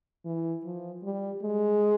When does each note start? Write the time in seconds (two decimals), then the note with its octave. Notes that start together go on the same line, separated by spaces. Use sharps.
0.26 E3
0.64 F3
1.04 G3
1.43 G#3